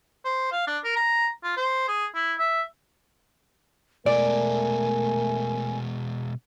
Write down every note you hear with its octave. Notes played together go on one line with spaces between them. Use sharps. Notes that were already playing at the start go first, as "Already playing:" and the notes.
C5
F5
D4
A#4
A#5
F4
C5
G#4
E4
E5
B2 G#3 A3 A#4 D5 G#5